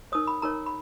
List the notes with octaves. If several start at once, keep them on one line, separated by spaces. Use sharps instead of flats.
D#4 A#4 C#5 D#6
B5
D#4 A#4 C#5 A#5
B5